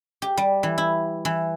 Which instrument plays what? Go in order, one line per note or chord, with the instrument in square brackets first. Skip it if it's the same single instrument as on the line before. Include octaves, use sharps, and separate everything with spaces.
[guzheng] G4
G3
E3
E4
E3